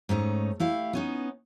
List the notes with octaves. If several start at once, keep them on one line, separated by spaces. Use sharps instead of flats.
G#2 A3 C#4 D#4
A3 E4 G4 F5
B3 C#4 D#4